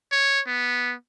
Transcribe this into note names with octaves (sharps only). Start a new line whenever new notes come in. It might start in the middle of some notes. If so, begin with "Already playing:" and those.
C#5
B3